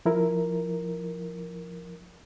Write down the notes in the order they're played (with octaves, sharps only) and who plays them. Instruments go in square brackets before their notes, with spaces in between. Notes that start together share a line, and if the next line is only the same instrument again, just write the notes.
[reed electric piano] F3 E4 A#4